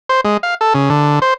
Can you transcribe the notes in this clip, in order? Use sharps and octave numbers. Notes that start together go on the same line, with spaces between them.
C5
G#3
F5
A4
C#3
D3
C5